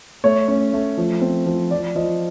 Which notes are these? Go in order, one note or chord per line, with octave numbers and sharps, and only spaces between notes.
A3 C#5
C#4
A3
F3
C4
F3
F3 D5
F3 D#5